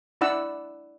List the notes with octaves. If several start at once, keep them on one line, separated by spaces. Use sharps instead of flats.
D4 E4 D5 F#5 E6